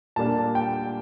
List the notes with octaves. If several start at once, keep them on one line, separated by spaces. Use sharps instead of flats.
A#2 G3 A#3 D4 A5
G5